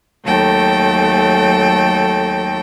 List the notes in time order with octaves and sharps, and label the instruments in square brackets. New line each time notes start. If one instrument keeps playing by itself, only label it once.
[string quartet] D#2 F#3 A3 A4 G5